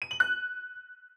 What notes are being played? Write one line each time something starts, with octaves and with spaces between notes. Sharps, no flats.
D#7
F#7
F#6